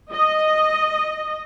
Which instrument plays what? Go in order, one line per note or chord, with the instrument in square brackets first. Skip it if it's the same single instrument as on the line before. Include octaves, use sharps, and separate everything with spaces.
[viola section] D#5